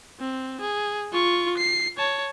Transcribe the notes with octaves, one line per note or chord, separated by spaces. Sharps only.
C4
G#4
F4 C#6
C7
C#5 A5